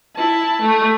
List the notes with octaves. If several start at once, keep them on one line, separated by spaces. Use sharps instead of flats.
E4 A5
A3